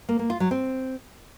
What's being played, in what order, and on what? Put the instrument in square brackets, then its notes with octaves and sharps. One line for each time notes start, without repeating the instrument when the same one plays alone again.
[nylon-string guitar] A#3
A#3
F4
F#3
C4